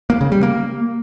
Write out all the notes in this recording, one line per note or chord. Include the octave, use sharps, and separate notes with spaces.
A#3
C#3
G3
A#3